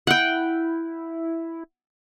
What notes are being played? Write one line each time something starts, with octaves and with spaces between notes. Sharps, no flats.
E4 F#5 G5